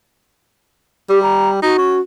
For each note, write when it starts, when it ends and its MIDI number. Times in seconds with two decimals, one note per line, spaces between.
1.10 1.61 55
1.10 1.21 67
1.23 1.50 82
1.62 1.73 63
1.62 2.00 66
1.78 1.98 61